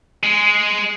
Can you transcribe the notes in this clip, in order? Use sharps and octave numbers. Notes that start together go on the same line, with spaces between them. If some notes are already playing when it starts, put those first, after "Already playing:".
G#3